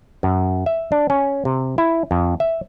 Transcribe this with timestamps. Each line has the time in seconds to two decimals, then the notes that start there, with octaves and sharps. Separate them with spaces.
0.23 F#2
0.66 E5
0.92 D4
1.10 C#4
1.45 C3
1.78 E4
2.11 F2
2.40 E5